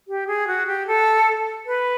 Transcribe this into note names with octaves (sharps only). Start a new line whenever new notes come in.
G4
G#4
F#4
G4
A4
B4